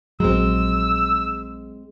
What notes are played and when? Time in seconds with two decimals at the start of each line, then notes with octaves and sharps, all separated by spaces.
0.20 A#1 F#3 G#3 C4 E6